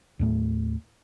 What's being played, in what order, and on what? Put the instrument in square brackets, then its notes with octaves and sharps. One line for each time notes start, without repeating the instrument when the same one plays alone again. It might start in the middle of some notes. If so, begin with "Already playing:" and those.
[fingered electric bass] D#2 A2 A3